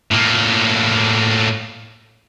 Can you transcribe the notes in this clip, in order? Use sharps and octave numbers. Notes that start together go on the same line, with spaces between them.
A2 A#3